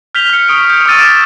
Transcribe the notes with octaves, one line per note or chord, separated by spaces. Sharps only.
F6 G6 B6 F7 G7
F6 C#7
C#6 D#6 D7
G6 D7
C#6 D6 E6 F6 A6 D#7
A6 D7 E7